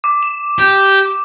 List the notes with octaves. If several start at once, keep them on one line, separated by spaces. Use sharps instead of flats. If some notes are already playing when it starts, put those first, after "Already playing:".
D6
E7
G4